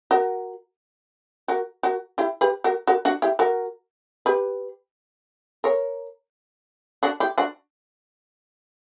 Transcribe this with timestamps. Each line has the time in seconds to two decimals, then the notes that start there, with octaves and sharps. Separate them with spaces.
0.11 F#4 A#4
1.48 F#4 A#4
1.83 F#4 A#4
2.18 E4 G4
2.41 G4 B4
2.64 F#4 A#4
2.87 F#4 A#4
3.05 D4 F#4
3.22 E4 G4
3.39 F#4 A#4
4.26 G4 B4
5.64 A#4 C#5
7.03 D4 F#4
7.20 E4 G4
7.38 D4 F#4